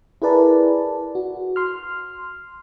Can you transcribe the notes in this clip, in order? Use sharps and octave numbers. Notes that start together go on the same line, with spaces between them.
E4 G#4 A#4 B4 D5 A5
F#4
C6 F6